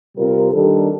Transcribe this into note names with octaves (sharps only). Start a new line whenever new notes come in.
C3 G3 C4 F4 A#4
D#3 G3 D4 A4